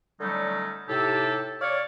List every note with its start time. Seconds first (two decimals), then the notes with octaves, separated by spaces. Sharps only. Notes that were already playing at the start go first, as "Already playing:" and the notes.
0.21 D3 F#3 G3 A3 C#4 D#4
0.88 A2 C3 D#4 G4 A4
1.62 C#5 D5 F5